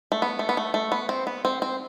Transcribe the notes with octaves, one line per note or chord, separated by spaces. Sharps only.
A3
B3
A3
B3
A3
A3
B3
C4
B3
C4
C4